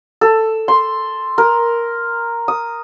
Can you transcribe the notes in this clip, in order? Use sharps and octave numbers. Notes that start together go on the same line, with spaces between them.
A4
C6
A#4
D#6